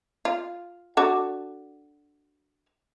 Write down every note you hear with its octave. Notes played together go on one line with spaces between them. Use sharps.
F4
D4 F#4 A4